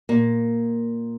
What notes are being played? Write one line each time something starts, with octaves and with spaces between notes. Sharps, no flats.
A#2 A#3